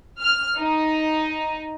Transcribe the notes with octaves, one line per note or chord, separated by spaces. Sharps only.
F6
D#4